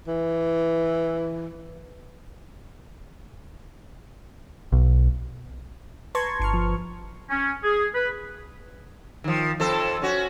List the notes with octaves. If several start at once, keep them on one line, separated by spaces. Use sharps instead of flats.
E3
B1
B4 A5 A#5 C6 C#6 G#6
G1 C#6 F6
F3
C#4
G#4
B4
D#3 F3
F2 A4 C5
C#4 F#4